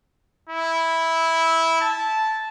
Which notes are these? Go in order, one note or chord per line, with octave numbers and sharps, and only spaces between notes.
E4
A5